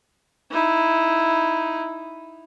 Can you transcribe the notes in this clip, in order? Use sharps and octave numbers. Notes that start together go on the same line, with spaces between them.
D#4 E4